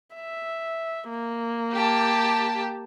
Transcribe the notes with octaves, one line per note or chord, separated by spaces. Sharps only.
E5
A#3
G4 A5